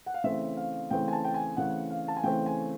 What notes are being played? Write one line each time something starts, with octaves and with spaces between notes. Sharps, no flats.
F#5
F5
C#3 E3 A3 C4 E5
F5
C#3 E3 A3 C4 G5
G#5
A5
G5
G#5
C#3 E3 A3 C4 F#5
F5
A5
G#5
C#3 E3 A3 C4 G5
G#5